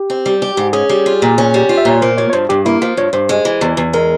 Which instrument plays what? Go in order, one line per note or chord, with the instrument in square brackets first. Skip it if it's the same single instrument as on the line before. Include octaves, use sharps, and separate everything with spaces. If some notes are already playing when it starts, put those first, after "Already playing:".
Already playing: [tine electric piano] G4
[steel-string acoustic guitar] C4
G3
G4
G#2
[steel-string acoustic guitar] C#4 [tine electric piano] G#4
[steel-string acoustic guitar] G3
F4
A#2
C#4
G3
F4
[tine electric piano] E5
[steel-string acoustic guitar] A#2 [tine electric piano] C#5
[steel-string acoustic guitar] A#3 [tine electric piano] C5
[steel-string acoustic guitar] F3 [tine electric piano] C#5
[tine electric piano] C#5
[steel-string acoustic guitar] G2 [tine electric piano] C5
[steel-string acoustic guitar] G2 [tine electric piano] G4
[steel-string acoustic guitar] A#3 [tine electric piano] E4
[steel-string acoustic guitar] F3 [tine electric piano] F4
[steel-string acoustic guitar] G2 [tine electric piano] C#5
[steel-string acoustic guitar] G2 [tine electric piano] C5
[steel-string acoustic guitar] G#3
E3
E2
E2
[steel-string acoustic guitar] G#3 [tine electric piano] A#4